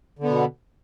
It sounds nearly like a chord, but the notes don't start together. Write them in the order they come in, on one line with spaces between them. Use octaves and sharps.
D3 B3 B2